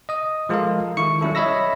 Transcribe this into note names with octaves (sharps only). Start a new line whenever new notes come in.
D#5 D#6
F3 G#3 F4 A4 A#4 F5
D#3 E4 C#6 C#7
F#3 G3 C#4 E4 A4
C#5 D#5 E5 B5 E6 A#6